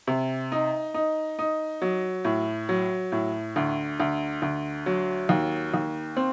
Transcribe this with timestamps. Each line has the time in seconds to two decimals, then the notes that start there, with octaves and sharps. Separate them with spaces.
0.08 C3
0.52 D#4
0.94 D#4
1.39 D#4
1.82 F#3
2.25 A2
2.69 F#3
3.12 A2
3.56 D2
4.00 D2
4.42 D2
4.86 F#3
5.29 D#2
5.74 D#2
6.17 C4